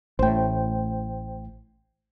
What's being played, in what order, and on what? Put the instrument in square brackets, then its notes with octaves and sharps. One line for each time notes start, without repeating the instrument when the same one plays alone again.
[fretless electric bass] A1 A2 [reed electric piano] C5 G5